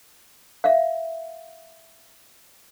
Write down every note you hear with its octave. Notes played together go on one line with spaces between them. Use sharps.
E5 F5